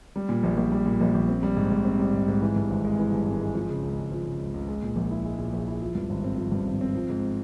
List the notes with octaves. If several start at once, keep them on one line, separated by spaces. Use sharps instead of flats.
G3
A#2
A#1
A#1
G3
A#2
A#1
A#1
C4
G3
G#2
G#2
C4
G3
G#2
G#2
E3
G2
G#1
G#3
E3
G2
G#1
G#3
F3
C#3
C#2
C#2
F3
C#3
C#2
C#2
G#3
A#2
A#1
E4
G#3
A#2
A#1
E4
F3
G2
G#1
C4
F3
G2
G#1
C4
F3
G#2